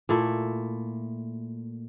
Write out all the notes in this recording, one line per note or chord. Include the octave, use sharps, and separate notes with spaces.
A#2 A3 E4